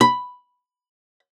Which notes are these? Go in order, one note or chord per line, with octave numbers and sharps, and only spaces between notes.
B5